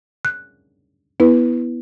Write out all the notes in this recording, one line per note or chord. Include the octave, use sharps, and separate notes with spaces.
F#6
B3 E4 B4